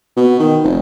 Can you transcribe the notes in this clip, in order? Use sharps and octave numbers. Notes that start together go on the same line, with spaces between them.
B2
D#3
F1